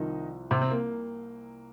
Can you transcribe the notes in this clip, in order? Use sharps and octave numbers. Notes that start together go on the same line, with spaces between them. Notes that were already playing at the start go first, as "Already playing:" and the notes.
Already playing: C2 C3 D#3 F3 D#4
C3 C4
C4
A#3